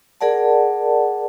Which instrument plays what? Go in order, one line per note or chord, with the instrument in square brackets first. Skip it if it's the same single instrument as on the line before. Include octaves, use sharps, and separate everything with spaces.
[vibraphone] G#4 A#4 D5 F#5 A5